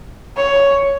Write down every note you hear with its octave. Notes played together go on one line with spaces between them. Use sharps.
C#5